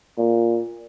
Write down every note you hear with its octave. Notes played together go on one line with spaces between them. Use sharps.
A#2